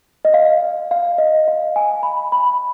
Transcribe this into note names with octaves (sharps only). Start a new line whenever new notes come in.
D#5
F5
F5
D#5
F5
G#5
B5
B5